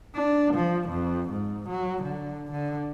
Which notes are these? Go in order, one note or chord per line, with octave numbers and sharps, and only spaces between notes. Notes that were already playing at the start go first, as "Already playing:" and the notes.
D4
F3
F2
G#2
F#3
D3
D3